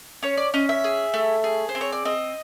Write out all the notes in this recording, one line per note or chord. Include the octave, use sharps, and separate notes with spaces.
C#4 C#5
D5
C#4 D#5
E5
G#4
A3
G#4
C5
C4
C#5
D5
C4 D#5